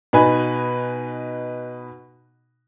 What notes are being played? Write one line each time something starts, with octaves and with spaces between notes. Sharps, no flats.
B2 D#4 B4 G#5 B5